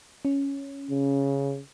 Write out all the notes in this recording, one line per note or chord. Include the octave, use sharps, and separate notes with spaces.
C#4
C#3